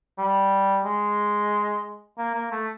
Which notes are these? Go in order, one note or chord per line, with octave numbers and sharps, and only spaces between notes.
G3
G#3
A#3
A#3
A3